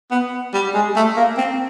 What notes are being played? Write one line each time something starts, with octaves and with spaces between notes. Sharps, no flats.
B3
G3
G#3
A3
A#3
C4